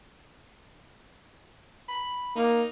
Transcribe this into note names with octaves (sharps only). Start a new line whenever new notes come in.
B5
A#3 D#4